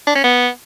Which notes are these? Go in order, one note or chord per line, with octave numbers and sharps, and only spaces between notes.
D4
C#4
B3